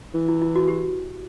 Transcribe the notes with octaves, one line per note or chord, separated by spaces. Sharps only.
E3
E4
E4
F#4
G4